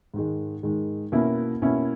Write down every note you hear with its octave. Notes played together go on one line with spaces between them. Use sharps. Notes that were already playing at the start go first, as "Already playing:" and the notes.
G#2 D#3 G#3
G#2 D#3 G#3
B2 A#3 C#4 E4
B2 A#3 C#4 E4